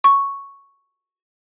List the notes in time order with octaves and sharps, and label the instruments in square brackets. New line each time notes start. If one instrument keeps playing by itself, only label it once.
[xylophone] C#6